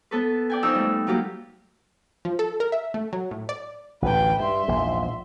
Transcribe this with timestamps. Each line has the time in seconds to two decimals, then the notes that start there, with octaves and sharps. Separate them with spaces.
0.11 B3 A4 B4
0.50 D5 G5 G#5
0.63 F2 D#4 E6 G6
0.75 G3 A3
1.07 F#3 A#3 F4 G4
2.25 F3
2.39 A4
2.60 A#4
2.72 E5
2.94 A3
3.13 F#3
3.31 A2
3.49 D5
4.02 A1 D2 B4 G5
4.40 G2 E5 C6
4.68 A#1 E2 G#2